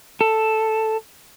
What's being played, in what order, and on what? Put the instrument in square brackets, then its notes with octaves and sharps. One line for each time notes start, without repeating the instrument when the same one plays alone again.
[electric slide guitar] A4